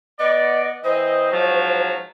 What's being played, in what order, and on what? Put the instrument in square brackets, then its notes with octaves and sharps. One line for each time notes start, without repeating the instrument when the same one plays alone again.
[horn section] B3 D5 [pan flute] D#5
[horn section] E3 C4 D#5 [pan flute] C5
[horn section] G#2 F3 F#3